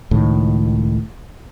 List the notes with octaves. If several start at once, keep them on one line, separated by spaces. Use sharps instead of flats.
C#2 A2 D#3